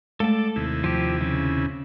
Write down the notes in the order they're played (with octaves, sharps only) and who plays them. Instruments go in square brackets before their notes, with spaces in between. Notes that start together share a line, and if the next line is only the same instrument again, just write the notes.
[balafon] G#3 A3 [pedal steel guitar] A4 A5 [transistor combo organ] D5
[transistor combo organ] D#2 C3 E4
[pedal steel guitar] F3 G4
C#3